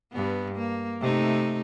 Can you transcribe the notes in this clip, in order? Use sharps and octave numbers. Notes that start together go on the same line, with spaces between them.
G2 B3
A#3
C3 A3 D#4